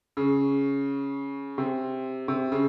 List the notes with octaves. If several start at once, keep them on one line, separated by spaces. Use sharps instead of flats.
C#3
C3
C3
C#3